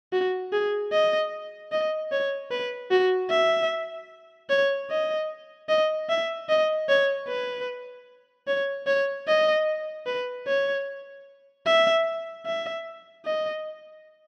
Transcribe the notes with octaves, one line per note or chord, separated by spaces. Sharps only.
F#4
G#4
D#5
D#5
C#5
B4
F#4
E5
C#5
D#5
D#5
E5
D#5
C#5
B4
C#5
C#5
D#5
B4
C#5
E5
E5
D#5